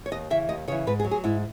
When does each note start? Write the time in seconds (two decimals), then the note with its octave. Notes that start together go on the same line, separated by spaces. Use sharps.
0.06 C#5
0.12 D#2 D#5
0.30 C#3 E3 E5
0.49 D#2 D#5
0.68 C#3 C#5
0.72 E3
0.87 G#2 B4
1.00 G#4
1.05 F#3
1.11 G#4
1.24 G#2 E4